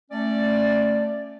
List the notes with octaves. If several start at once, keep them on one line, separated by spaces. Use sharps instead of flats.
A3 C#4 D5